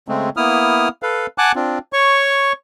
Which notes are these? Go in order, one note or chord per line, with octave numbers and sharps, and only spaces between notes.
C#3 G#3 A3 C4
A#3 B3 E4 D#6 F6
A4 B4 F5
F#5 G#5 A5 D6 F#6
C4 D4 F4
C#5 C#6